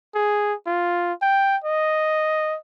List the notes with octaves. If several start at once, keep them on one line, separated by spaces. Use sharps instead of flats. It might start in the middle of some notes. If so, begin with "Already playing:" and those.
G#4
F4
G5
D#5